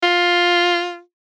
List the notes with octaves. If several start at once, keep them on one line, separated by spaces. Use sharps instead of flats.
F4